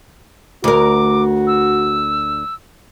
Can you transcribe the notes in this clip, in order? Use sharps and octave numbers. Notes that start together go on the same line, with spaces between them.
D2 F#4 A#4 D6
E6